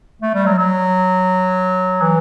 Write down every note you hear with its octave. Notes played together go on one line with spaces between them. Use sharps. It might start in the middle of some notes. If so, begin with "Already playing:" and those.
A3
G3
F#3
F#3
E3